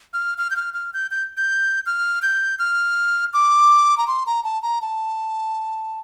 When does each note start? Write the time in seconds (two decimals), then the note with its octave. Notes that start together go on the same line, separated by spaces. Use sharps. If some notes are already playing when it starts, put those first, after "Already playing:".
0.13 F6
0.38 F6
0.50 G6
0.56 F6
0.74 F6
0.94 G6
1.11 G6
1.37 G6
1.86 F6
2.22 G6
2.59 F6
3.33 D6
3.98 A#5
4.07 C6
4.26 A#5
4.44 A5
4.62 A#5
4.82 A5